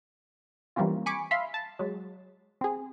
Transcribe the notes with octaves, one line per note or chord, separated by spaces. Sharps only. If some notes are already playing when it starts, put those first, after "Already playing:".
E3 G3 A#3 C4 C#4 F4
G#5 B5 C#6 D6
E5 F5 B5 C6
A5
F#3 G#3
C4 G#4